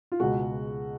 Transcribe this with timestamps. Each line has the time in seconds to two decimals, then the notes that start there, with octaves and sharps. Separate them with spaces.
0.12 F4
0.20 C#2 B2 G#3 F#4